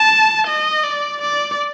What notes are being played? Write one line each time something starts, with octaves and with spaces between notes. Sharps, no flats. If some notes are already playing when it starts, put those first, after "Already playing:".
Already playing: A5
D#5
D5
D5